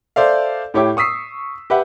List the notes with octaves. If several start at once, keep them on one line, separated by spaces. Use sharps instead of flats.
A4 C5 D5 E5 F5
A2 E4 G4 C#5 E5 D6
C#6 D#6 E6 B6 C7
G4 B4 E5 F#5